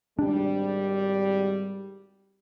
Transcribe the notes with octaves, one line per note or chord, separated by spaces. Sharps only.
G#1 G3 D4